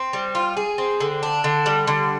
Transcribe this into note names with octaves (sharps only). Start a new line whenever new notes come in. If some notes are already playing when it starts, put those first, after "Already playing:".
Already playing: C4
G3
F4
G#4
C4
D3
D4
D3
G3
D3